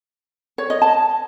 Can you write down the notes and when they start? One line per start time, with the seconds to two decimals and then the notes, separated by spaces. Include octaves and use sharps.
0.58 C#5
0.70 D#5
0.82 A5